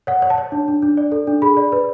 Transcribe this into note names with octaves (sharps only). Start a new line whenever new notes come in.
C#5 F#5
C#5
A5
C#5
D4
D4
D4
D5
A4
D4
G#4 B5
D5
B4